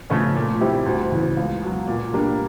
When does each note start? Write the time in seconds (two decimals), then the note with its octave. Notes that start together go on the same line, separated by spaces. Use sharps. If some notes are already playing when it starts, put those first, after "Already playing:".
0.10 C#3 F3 A3 C#4
0.35 A#2
0.61 G3 C4 E4 G4
0.86 D2
1.12 C#3 E3
1.37 C#2
1.62 B2 F#3
1.87 A#2
2.13 G3 A#3 D4